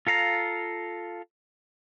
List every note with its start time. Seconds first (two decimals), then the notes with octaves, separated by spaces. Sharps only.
0.07 F4 A4 F5 A#5